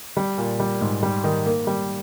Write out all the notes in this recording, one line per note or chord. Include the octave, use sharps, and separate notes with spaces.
G3
A#2
G3
G#2
G3
D#3
A#3
G3